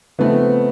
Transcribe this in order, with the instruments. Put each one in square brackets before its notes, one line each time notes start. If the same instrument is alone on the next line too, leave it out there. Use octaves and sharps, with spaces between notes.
[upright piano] C#3 F3 A3 C4 D#4 [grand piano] B3